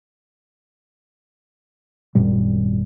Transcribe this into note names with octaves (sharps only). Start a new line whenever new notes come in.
G#1 F#2 A#2 G3